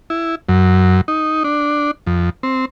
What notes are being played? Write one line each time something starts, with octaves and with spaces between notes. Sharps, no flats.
E4
F#2
D#4
D4
F2
C4